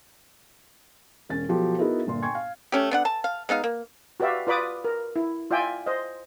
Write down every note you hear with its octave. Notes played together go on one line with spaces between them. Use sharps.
E1 C#4 A6
B2 F3 F#3 F#4 G4 A4
B3 D#4 E4 F#4 G#4 A#4
G1 A#2 C6
G5 G#5 C6 C#6 G#6
F5
A3 C#4 G4
B3 D4 F#5
A5
F5
G#3 B3 D#4 F5
A#3
F#4 G4 B4 D5 E5 F5
F4 B4 D5 B5 D6 D#6
A#4
E4
F4 D5 E5 G5 G#5
C5 D#5